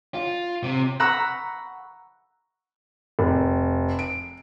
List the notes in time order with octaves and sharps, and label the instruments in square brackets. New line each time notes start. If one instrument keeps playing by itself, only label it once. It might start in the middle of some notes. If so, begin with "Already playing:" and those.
[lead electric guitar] F4
C3
[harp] F#5 A#5 B5 C#6 E6
[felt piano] F1
D7